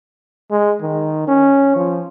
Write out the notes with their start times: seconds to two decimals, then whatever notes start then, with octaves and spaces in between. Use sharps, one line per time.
0.51 G#3
0.82 D#3
1.28 C#4
1.76 F3